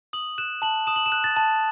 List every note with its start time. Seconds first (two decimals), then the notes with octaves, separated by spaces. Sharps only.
0.13 D#6 F#7
0.38 F#6 E7
0.62 A5 F#7
0.87 D#6 E7
0.96 F#7
1.06 E7
1.12 F#6
1.24 A6
1.37 A5